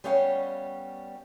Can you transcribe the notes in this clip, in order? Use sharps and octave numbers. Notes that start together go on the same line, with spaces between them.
G3 B3 C#4 C#5 F5 G5